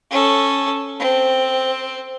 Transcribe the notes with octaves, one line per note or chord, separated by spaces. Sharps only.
C#4 A4
C4